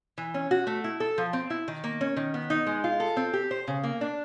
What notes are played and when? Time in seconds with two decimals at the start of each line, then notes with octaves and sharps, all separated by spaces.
0.18 E3
0.34 C#4
0.51 F#4
0.67 A3
0.84 E4
1.00 A4
1.18 F3
1.33 C4
1.50 E4
1.68 D#3
1.84 A#3
2.01 C#4
2.17 D#3
2.34 B3
2.50 D#4
2.66 G#3
2.84 F4
3.00 A4
3.16 C4
3.33 G4
3.51 C5
3.68 C#3
3.84 A#3
4.01 D4